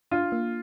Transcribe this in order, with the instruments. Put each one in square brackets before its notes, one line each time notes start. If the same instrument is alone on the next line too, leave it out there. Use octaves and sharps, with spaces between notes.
[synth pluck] D4 [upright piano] F4
[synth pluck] A#3